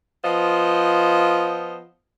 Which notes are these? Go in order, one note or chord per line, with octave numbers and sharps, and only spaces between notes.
F3 B3 F4 C5 D#5